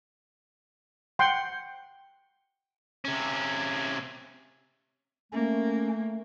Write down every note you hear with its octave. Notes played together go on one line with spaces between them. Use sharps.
F#5 G5 C6
C3 C#4
A3 A#3 C#4